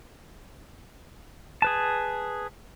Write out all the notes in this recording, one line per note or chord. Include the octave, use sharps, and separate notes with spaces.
G#4 B4 A5